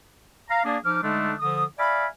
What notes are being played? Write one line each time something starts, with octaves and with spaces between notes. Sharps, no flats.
F5 A#5
A#3 D4 G#4 D5
F3 D#4 D6 F6
D3 G#3 A3 D4 D#4
D3 F3 D#6
D5 E5 F5 G#5 B5